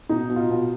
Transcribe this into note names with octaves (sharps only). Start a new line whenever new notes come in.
B2 D#4
B2
F4
B2